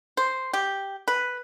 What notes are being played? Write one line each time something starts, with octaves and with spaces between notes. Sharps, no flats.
C5
G4
B4